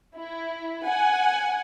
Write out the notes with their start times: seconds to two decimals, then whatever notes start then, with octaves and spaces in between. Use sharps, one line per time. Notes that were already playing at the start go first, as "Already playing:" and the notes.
0.17 E4
0.86 F#5 G#5